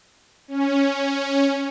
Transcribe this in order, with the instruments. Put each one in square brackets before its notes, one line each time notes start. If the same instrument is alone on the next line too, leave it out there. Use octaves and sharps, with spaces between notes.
[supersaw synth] C#4